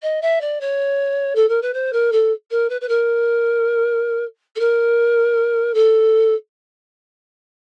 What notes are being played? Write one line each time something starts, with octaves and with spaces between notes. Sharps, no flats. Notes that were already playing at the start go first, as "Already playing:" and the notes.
D#5
E5
D5
C#5
A4
A#4
B4
C5
A#4
A4
A#4
B4
B4
A#4
A4
A#4
A4